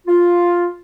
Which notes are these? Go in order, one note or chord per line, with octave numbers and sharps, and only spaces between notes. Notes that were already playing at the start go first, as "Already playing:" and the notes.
F4